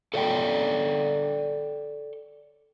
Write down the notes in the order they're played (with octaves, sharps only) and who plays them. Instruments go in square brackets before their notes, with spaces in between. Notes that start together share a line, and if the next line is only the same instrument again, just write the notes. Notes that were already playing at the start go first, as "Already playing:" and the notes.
[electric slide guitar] A4 C#5 D5 F#5 G5